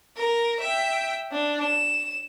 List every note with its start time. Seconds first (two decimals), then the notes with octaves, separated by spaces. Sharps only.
0.17 A#4
0.60 E5 G5
1.32 D4
1.63 E7